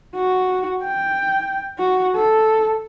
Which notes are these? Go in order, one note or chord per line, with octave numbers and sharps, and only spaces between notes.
F#4
G5
F#4
A4